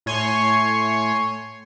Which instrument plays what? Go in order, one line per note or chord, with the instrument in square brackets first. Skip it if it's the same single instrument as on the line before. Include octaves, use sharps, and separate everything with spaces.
[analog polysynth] A2 C#5 G#5 C6 C#6